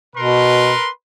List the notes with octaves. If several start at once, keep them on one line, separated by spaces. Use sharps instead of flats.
B2 A#4 B4 C6